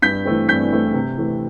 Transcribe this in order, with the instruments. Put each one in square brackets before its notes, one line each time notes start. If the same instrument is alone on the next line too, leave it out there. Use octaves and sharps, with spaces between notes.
[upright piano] G2 G6 B6
E3 A3 C4
G2 G6 B6
E3 A3 C4
C3
E3 A3 C4